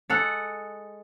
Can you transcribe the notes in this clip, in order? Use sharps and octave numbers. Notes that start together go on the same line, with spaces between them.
G#3 A4 F#5